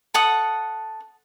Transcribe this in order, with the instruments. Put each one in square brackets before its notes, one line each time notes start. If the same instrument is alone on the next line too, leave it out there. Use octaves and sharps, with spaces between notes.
[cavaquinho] A4 F#5 D#6